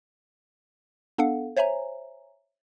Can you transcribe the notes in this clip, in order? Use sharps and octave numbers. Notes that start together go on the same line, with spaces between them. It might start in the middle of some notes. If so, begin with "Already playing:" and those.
B3 D4 A4 F5 F#5
C5 C#5 E5 G#5 A#5